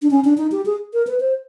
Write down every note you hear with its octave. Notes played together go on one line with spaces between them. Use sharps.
D4
C#4
D4
D#4
G4
G#4
A#4
B4
C5